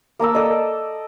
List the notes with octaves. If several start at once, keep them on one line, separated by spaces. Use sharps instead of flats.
A#3 A#4 A5 E6
A4 D5 D#5